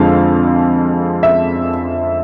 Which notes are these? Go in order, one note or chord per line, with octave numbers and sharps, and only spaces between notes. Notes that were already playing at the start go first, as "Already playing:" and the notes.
Already playing: F2 D3 F3 G#3 F5
E5